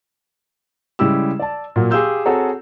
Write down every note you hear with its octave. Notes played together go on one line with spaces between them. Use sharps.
C#3 G3 G#3 E4 G4 E6
D5 A5
A#2 F#3 A#3
G4 G#4 F5 C6 E6 G6
C4 F#4 G#4 A4 C#5 A#5